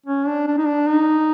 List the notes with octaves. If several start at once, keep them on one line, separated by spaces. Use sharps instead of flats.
C#4
D4
D4
D#4
D4
D#4